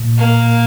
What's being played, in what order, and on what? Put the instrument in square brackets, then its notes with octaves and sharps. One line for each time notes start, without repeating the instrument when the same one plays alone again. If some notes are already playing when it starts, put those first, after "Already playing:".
Already playing: [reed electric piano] A#2
[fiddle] A#3